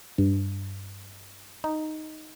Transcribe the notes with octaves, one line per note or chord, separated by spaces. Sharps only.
G2
D#4